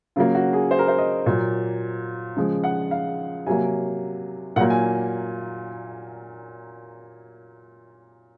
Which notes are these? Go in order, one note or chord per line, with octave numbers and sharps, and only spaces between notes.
C#3 F#3 A#3 F4
F#4
G#4
C5
A#4
C5
D#5
A#2 F#3 A#3
C#3 F3 G#3
F#5
F5
C3 F#3 A#3 G#5
A#2 F#3 A#3 F#5
G#5